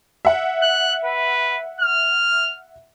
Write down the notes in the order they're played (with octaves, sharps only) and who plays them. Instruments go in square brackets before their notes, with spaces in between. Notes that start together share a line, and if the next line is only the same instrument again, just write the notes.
[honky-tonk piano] E5 F#5
[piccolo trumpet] F#6
B4
F6